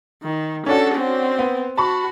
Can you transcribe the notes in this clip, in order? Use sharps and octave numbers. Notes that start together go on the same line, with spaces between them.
D#3
C#4 D4 F#4 A4
C4
B3
F#4 A5 B5 C#6